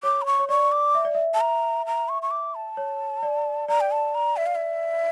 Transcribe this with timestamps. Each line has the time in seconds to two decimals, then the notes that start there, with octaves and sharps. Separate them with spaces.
0.03 C#5 D6
0.22 A#5
0.26 C#6
0.39 C#5
0.49 D5 C#6
0.72 D6
0.95 E5
1.05 D5
1.15 E5
1.34 A5
1.41 A#5
1.86 A#5
2.09 C#6
2.22 C#6
2.31 D6
2.55 A5
2.77 C#5
3.23 D5
3.68 D5 A#5
3.81 G5
3.91 A5
4.15 A#5
4.37 E5
4.46 F5
4.55 E5